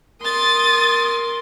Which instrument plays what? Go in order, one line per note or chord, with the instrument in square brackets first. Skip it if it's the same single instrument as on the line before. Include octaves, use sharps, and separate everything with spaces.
[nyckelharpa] A#4 C6 [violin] D#6 A6